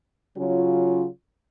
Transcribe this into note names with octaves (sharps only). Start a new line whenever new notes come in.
C#3 F#3 C#4 F4